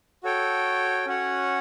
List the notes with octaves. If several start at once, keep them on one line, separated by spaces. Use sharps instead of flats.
F#4 A4 C#5 G5
C#4 F#4 C#5 F#5